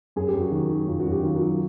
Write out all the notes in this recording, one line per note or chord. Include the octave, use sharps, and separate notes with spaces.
F#2 G#4
G4
F#2
F#4
D#3
F#3
F#2 F4
F#4
F#2
G4
D#3 F4
F#4
F#3
F#4